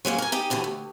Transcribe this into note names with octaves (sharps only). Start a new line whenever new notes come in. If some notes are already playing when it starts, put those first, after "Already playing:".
F#3 G#3 A#3 C#4
A#4 G#5
D#4 G4 D#5
D#2 B2 D3 E3
D2